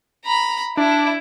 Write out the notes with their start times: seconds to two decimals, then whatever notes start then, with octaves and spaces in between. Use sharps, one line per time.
0.24 A#5 B5
0.77 D4 E4